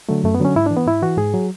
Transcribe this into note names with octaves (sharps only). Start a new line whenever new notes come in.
D3 F#3 A3
F#2 A3
B3
D3 F#3 C#4
G#2 E4
D4
E3
B3
G#2 E4
E3 F#4
G#2 G#4
F#3